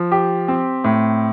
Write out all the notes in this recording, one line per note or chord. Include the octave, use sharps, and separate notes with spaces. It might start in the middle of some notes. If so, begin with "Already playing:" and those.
Already playing: F3
G4
C4
A2